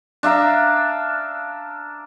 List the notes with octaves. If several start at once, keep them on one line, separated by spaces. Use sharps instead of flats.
D4 E5 F5 A#5